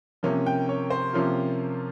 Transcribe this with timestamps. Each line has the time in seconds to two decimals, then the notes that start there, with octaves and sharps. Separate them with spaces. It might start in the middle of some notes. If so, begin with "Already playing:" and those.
0.23 C3 F3 A#3 C#4
0.46 G5
0.69 C#5
0.90 C5
1.13 C3 F3 A#3 C#4 F4